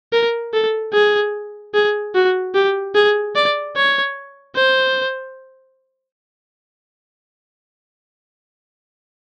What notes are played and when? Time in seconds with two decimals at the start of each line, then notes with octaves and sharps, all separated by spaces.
0.13 A#4
0.53 A4
0.93 G#4
1.74 G#4
2.15 F#4
2.54 G4
2.95 G#4
3.35 D5
3.76 C#5
4.55 C5